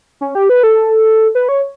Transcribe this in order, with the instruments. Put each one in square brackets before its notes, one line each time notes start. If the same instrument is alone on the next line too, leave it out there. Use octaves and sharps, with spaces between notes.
[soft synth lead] C#4
G4
B4
A4
B4
C#5